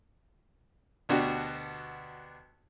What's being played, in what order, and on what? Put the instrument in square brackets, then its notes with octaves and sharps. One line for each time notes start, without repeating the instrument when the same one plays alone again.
[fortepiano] D2 B2 D4 F#4 G4